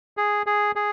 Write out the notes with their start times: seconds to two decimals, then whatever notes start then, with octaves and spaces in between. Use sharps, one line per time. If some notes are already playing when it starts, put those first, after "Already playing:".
0.17 G#4
0.46 G#4
0.76 G#4